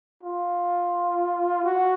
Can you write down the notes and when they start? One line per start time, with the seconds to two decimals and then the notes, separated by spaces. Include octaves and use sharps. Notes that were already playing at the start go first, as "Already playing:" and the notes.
0.23 F4
1.64 F#4